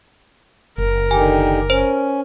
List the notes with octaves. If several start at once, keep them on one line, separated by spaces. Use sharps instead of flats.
F#1 A#4
D3 D#3 G4 G#5
C#4 C5